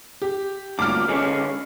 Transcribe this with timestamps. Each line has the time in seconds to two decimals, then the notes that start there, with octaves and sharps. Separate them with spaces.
0.22 G4
0.79 D2 G2 A#2 D6 F6
1.08 D3 G#3 C#4